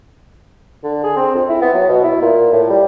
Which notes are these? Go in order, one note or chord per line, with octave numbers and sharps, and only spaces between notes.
D3
G#4
C4
F2
E4
B3
F#3
B2
E4
A#2
A2
G3